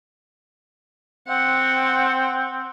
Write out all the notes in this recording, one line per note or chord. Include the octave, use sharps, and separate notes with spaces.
C4 F#5